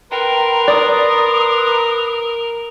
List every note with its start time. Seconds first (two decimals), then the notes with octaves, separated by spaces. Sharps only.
0.11 A#4 B4 G5 A#5 C6
0.68 D5 D#6